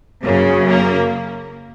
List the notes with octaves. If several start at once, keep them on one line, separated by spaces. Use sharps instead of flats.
F#2 C#3 A#3
A#3